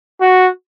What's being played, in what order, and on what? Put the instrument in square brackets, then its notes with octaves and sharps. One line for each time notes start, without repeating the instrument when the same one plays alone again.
[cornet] F#4